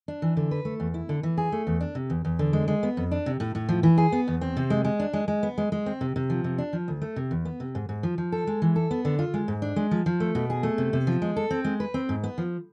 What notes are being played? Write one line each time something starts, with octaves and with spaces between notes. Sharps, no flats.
D4
E3
D3
B4
A3
E2
E4
D3
E3
G#4
A3
E2
D4
C3
E2
E2
D3
G#3
G#3
B3
F2
D4
C3
A2
A2
F3
E3
G#4
B3
E2
C4
C3
G#3
G#3
D4
G#3
G#3
B3
G#3
G#3
C4
C3
C3
F3
C3
D4
F3
D2
A3
C3
E2
B3
C3
G#2
G#2
F3
F3
A4
G#3
E3
A4
B3
D3
F4
G#3
G#2
D4
G#3
F3
F3
A3
B2
G#4
A3
C3
C3
F3
G#3
A4
C4
G#3
B4
C4
G#2
B3
F3